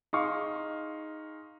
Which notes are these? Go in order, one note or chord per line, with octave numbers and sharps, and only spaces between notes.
D#4 G#4 F5 C6 C#6